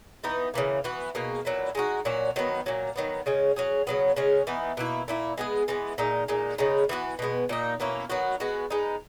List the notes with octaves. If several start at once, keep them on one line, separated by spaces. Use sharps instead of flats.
E3 B3 D#4
C#3 E3 A#3
E3 B3 F#4
B2 A#3 D#4 G#4
A#2 F#3 B3 E4
G#3 D#4 F#4
A#2 F#3 C#4 F#4
D#3 F#3 B3
A#2 F#3 A#3
D#3 F#3 B3
C#3 G#3 C#4
F#3 C#4 G#4
C#3 F#3 B3
C#3 G#3 C#4 G#4
E3 B3 D#4
B2 A#3 E4
A#2 A#3 E4
G#3 B3 E4 G#4
E3 G#3 B3
A#2 G#3 D#4
A#2 G#3 D#4
C#3 G#3 B3 D#4
E3 B3 F#4
B2 G#3 B3
A#2 A#3 D#4
B2 A#3 C#4 E4
D#3 F#3 B3 F#4
G#3 B3 F#4
G#3 B3 D#4